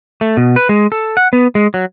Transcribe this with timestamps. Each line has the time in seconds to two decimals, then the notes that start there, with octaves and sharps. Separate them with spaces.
0.21 A3
0.37 B2
0.56 B4
0.69 G#3
0.92 A4
1.17 F#5
1.33 B3
1.55 G#3
1.74 F#3